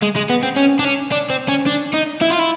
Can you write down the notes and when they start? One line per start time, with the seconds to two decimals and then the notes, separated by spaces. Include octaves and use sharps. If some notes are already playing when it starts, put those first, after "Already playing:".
0.02 G#3
0.16 G#3
0.30 B3
0.43 C4
0.57 C#4
0.80 D4
0.85 C#4
1.12 D4
1.30 C4
1.49 C#4
1.66 D4
1.93 D#4
2.21 E4
2.30 F4
2.39 E4